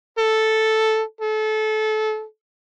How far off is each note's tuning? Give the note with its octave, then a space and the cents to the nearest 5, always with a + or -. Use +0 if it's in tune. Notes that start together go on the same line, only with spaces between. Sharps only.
A4 +0
A4 -25